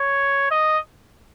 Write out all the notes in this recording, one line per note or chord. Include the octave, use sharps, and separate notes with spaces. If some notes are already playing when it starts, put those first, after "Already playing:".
Already playing: C#5
D#5